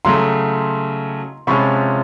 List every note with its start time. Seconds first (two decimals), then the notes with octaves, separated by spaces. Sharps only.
0.05 C#3 F#3 A3 A#5 C6
1.47 C3 F3 G#3 C#4 F4 B5 C#6